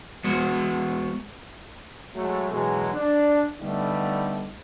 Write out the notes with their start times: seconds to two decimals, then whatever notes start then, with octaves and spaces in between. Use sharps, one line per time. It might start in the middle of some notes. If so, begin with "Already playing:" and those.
0.24 G#3 B3 F#4
2.16 F#3 G#3 A3
2.52 B2 E3 F#3 G#3
2.94 D4
3.61 D3 G3 A3 B3 D#4